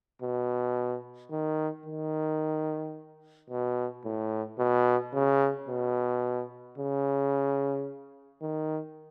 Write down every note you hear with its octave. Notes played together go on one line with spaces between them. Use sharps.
B2
D#3
D#3
B2
A2
B2
C#3
B2
C#3
D#3